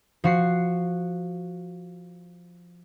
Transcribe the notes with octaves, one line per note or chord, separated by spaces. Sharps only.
F3 F#4 C7